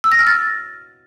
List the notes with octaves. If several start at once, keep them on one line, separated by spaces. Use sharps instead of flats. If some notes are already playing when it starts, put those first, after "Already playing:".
E6
A#6
F6
A6